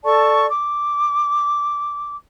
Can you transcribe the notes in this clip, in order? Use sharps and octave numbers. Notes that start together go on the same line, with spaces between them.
A4 D5 A5 C#6
D6